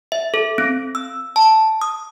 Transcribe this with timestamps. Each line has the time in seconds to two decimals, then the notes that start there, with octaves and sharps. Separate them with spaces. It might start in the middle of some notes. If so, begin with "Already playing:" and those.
0.12 E5
0.34 A4
0.58 C4
0.95 E6
1.36 A5
1.82 D#6